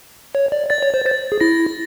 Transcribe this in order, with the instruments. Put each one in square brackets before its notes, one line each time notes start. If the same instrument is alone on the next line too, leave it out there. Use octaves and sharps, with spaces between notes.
[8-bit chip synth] C#5
D5
[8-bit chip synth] D5 [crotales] A6
[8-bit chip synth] C#5
C5
[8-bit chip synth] C5 [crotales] A6
[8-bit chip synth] G#4
[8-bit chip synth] E4 [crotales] A#6